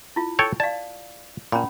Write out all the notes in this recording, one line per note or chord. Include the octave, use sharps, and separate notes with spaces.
E4 F4
A4 C#5 G5
D5 F5 A5
A#2 C#4 B5